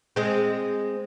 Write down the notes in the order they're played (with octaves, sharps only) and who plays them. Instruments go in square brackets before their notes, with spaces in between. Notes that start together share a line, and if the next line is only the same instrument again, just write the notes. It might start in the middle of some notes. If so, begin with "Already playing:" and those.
[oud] G#3 C4